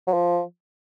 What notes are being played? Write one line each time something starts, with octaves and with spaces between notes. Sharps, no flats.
F#3
F3